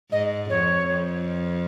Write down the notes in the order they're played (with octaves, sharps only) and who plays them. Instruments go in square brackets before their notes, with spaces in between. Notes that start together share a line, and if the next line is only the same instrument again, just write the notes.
[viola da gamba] G#2 [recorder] D#5
[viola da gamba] F2 [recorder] C#5
[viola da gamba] F2